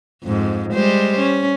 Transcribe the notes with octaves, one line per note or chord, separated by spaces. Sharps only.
F2 G#2
G3 G#3 C5
C#4